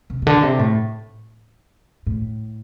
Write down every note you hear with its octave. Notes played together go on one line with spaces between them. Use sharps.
C3
C3
D3
C3
A2
A2